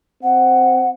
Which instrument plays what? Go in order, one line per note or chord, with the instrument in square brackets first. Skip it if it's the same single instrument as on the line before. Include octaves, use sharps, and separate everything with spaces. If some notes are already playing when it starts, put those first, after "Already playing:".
[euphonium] C4 [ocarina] F#5